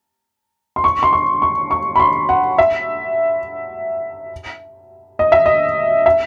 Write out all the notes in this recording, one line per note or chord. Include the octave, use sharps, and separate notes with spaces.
C6
C#6
C6
C#6
C#6
C#6
B5
C6
F#5
E5
D#5
E5
D#5
E5